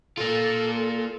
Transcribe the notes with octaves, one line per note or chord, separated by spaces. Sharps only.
A#3 F4 A4